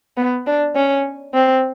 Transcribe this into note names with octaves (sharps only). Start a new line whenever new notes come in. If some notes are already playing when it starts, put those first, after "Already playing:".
B3
D4
C#4
C4